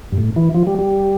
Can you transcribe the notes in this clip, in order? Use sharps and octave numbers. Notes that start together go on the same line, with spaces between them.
G2
A2
E3
F3
G3
G3